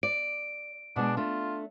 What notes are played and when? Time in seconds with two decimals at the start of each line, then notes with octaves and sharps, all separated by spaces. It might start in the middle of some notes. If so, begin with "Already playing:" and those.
0.03 D5 D7
0.96 B2 G#3 D4
1.17 A3 D4 F4